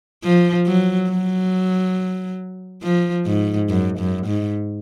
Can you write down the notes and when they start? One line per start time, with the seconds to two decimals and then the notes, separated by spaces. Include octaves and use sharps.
0.23 F3
0.66 F#3
1.10 F#3
2.83 F3
3.26 G#2
3.69 F#2
3.98 F#2
4.27 G#2